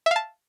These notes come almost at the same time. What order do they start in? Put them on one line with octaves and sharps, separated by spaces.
E5 F5 A5